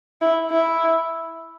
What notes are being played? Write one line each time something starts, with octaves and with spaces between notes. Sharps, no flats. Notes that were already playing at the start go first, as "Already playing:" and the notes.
E4
E4